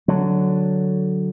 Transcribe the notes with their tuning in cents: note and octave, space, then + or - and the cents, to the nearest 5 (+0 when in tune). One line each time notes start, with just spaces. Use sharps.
D3 +0 F#3 +0